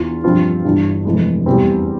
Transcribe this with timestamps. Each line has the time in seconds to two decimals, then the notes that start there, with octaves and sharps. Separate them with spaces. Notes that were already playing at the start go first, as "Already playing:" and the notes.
Already playing: E2 E3 F4
0.24 G2 F3 C4 F4
0.64 G1 G2 E3
1.05 F1 F2 E3 G#3
1.46 E2 E3 G3 C4